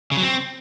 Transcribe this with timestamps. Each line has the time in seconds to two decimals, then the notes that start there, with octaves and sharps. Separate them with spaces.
0.12 C#3
0.17 F#3
0.23 C4